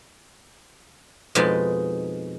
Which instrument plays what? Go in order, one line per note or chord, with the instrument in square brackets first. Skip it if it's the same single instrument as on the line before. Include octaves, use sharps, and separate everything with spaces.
[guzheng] F2 B2 G#3 D#4 B4 D5